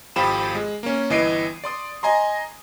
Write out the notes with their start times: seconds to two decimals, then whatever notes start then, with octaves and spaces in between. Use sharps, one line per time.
0.16 G#1 F2 F3 G4 B5 E7
0.55 G#3
0.83 A#3 C#4
1.10 G1 E3 D#5 C7 D7 D#7
1.64 D5 C6 D#6
2.03 D#5 G#5 A#5 C6